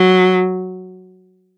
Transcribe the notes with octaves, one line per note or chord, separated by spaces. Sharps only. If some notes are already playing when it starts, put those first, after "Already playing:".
Already playing: F#3